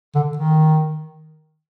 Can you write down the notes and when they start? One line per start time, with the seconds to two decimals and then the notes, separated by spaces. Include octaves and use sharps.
0.15 D3
0.37 D#3